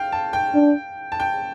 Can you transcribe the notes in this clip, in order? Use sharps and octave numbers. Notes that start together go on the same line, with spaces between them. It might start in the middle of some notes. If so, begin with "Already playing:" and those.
Already playing: F5 G5
A5
G5
D4
A5
G5